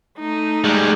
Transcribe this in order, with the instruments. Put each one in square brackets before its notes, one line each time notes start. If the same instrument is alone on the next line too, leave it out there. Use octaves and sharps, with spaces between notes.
[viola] A3 D#4
[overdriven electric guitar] G3 G#3